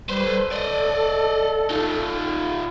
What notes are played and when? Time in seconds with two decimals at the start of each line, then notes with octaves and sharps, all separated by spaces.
0.09 G3 B4 C5
0.25 A4
0.51 D5 D#5
1.70 D#4 F4